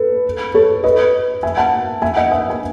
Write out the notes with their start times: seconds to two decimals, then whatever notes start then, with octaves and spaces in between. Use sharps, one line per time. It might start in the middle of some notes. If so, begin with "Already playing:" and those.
Already playing: A4 B4
0.54 A4 C#5
0.83 B4 D#5
1.43 E5 G#5
1.57 F#5 A5
2.02 E5 G#5
2.16 D#5 F#5
2.31 E5 G#5
2.50 G#5